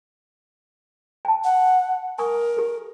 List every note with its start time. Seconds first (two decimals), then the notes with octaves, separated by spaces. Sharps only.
1.25 G5 A5
1.44 F#5
2.18 A#4 G#5 C#6 D#6
2.57 G4 A4